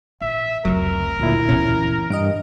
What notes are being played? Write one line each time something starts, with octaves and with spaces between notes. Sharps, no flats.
A#1 E5
F1 C#2 F#3 A#4
D2 A#2 D#3 E4
F#2 B2 E3 C#4
G2 D#5 F6 D7